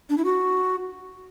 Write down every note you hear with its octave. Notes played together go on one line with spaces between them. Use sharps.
D4
E4
F#4